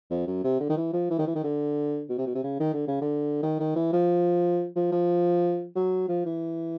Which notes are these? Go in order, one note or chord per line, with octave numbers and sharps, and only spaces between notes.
F2
F#2
C3
D3
D#3
E3
F3
E3
D#3
E3
D#3
D3
B2
C3
B2
C3
C#3
D#3
D3
C#3
D3
D#3
D#3
E3
F3
F3
F3
F#3
F3
E3